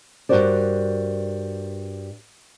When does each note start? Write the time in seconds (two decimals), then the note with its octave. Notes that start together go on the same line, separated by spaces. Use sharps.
0.29 G2 E3 F#4 A#4 C5 D5